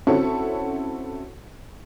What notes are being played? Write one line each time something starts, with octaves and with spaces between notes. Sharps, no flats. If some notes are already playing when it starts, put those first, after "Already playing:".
C4 C#4 E4 F#4 A4 C#5